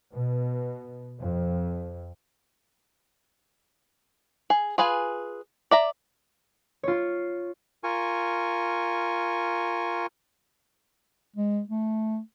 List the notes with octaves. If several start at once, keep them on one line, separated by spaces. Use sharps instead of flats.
B2
F2
G#4
F4 G#4 B4 G#5
D5 E5 A#5
F4 C#5
F4 A#4 G#5 C#6
G#3
A3